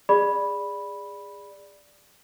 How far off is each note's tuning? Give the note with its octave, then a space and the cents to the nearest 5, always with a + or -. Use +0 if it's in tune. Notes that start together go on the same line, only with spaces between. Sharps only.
G#4 -20 D5 +0 B5 -5